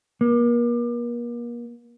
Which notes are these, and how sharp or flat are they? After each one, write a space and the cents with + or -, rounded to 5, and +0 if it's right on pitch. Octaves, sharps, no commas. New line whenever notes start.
A#3 +40